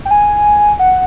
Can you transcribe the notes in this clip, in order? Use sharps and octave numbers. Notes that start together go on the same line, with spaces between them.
G5
G#5
F#5